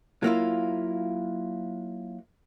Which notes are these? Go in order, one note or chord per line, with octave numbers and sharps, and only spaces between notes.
F#3 A#3 E4 F4